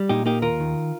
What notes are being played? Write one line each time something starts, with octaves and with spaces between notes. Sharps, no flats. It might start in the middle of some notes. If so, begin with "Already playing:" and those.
Already playing: G3
A#2 D#4 G4
A#3 D#4 G4
D#2 F4 A#4
D#3